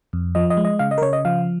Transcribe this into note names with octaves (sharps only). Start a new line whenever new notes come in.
F2
F3 D#5
D#5
G#3
D#5
C#3 F5
D#5
A#4
C#3 C#5
D#5
F3 F5